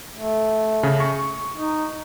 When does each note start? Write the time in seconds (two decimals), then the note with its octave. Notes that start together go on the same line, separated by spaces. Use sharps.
0.16 A3
0.83 C#3
1.00 C#6
1.53 D#4